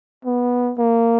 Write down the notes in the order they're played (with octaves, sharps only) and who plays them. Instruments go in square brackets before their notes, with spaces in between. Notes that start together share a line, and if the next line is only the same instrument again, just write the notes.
[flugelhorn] B3
A#3